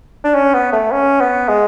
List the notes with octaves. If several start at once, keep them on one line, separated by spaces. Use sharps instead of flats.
D4
C#4
B3
A3
C#4
B3
G#3